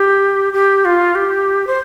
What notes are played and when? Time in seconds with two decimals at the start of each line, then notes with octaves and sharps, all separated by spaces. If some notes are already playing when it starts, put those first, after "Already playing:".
Already playing: G4
0.53 G4
0.85 F4
1.15 G4
1.67 C5